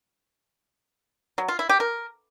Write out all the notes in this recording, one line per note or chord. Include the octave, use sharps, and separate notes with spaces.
F#3
F4
E4
G4
A#4